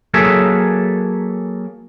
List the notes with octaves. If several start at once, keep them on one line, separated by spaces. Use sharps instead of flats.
F#3 A#3 G#4 A4 C#5 E5